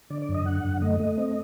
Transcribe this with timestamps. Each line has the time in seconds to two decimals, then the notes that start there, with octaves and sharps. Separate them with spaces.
0.10 D3 D5
0.22 D5
0.29 F#2
0.34 D#5
0.45 D3 F#5
0.64 F#2
0.82 A3 D#5
1.00 A3
1.17 C4